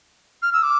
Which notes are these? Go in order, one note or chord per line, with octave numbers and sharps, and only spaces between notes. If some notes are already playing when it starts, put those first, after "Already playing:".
F6
E6
D6